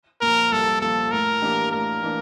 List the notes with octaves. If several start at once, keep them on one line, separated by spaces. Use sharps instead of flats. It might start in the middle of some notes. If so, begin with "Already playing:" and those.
A#2 F3 A#4
C2 A4
A#2 F3 A4
A2 A#4
E3 A#3 D4 G4
A2 A#4
E3 A#3 D4